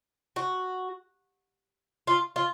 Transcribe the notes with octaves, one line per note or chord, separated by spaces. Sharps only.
F#4
F4
F4